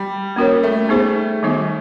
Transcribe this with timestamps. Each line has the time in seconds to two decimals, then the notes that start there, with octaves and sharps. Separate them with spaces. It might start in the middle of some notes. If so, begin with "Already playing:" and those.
Already playing: G3
0.36 A#3 C#4 F#4 A#4 C#5
0.63 A3
0.89 B3 D#4 G#4 C5
1.43 D#3 G3 B3 D#4 F#4